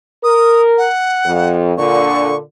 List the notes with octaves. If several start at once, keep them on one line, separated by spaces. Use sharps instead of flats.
A#4 D#6
F#5
F2
A#2 D3 C#6